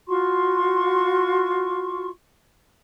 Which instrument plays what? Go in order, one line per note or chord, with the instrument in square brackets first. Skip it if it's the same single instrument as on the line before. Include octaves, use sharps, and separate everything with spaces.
[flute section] F4 F#4 C6 C#6